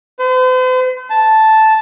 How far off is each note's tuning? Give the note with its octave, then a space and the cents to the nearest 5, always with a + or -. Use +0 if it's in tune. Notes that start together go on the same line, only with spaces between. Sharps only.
C5 -45
A5 -5